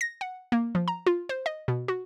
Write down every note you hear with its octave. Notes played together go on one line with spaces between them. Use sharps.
A#6
F#5
A#3
F3
A#5
F4
C5
D#5
B2
F#4